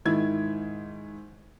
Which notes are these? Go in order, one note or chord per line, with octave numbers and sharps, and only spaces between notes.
G#2 D#3 E4 G#6